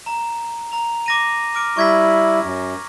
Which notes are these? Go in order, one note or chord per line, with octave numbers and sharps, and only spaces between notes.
A#5
A#5 F7
D6 A#6 D#7
D6 F6 D7
G3 E4 C#6 G#6 B6
F#2